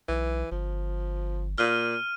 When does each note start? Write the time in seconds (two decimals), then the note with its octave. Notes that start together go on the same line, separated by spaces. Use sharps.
0.09 B1 E3
0.51 G1 F3
1.58 A#2 F6 D#7